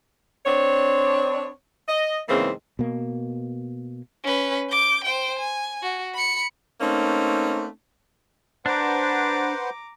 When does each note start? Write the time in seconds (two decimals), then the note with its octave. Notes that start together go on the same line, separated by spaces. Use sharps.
0.46 C4 D4 C#5
1.88 D#5
2.29 E2 G#2 C#3 E3 A#3 C4
2.79 B2 A#3
4.24 C#4 B4
4.70 D6 G6
5.04 C5 G5
5.39 G#5
5.82 F#4
6.14 B5 C#7
6.81 A3 A#3 C4 C#4 D#4
8.66 D4 B4 C5 F#5 A#5 D6